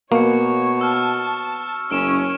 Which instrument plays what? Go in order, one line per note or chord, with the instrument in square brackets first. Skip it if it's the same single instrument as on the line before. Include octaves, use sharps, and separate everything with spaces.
[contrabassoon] B2 [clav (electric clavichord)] A#3 [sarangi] C#5 [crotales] C#6 C#7
[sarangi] A5 [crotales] E6 F6
[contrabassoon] F#1 [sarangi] C#4 [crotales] E6 D7 E7